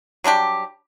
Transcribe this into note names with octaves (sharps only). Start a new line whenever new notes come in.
F#3 G3 D4 G4